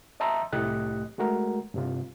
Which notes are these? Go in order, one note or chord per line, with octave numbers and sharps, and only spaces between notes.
D#5 E5 A5 A#5 C6 E6
C2 A2 A3 G4 D#5 F#6
G#3 A3 F#4 A#4
G2 C3 F4